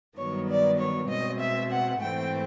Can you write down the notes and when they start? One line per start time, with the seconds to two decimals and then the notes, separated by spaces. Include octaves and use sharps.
0.17 G2 D#3 F#3 B3 C#5
0.49 D5
0.79 C#5
1.09 B2 G#3 C4 D#5
1.41 E5
1.70 F#5
2.01 G#2 E3 A3 C4 G5